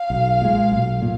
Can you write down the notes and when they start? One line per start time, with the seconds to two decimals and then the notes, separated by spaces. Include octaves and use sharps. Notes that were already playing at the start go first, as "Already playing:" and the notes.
Already playing: F5
0.10 B1
0.41 A#2 G#3
0.72 B1
1.02 A#2